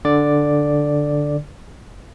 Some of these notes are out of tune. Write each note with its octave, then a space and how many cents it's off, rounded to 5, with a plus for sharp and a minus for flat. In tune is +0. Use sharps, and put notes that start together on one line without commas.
D3 +0 D5 +0